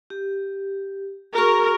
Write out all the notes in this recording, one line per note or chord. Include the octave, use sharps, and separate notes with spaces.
G4
F#4 G#4 A#4 C#6